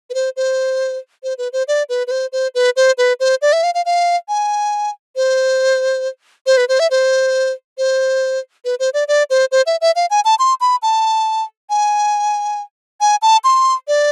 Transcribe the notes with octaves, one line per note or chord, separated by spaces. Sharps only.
B4
C5
C5
C5
B4
C5
D5
B4
B4
C5
C5
B4
C5
B4
C5
D5
E5
F5
F5
F5
G#5
C5
C5
B4
C5
E5
C5
C5
B4
C5
D5
D5
C5
C5
E5
E5
F5
G#5
A5
C6
B5
A5
G#5
G#5
A5
C6
D5